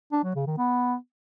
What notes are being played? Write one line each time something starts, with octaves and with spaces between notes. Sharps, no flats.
D4
F#3
C#3
D#3
B3